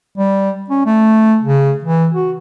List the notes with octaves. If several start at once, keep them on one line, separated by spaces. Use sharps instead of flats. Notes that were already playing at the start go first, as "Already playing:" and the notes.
G3
C#4
A3
C#3
E3
F#4